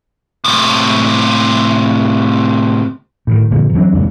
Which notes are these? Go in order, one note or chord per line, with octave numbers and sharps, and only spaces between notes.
A2 C3
A2 C3 D#3
G1 A#2 D3 F3
E2 F#3 C4 D4
D#1 C#2 D4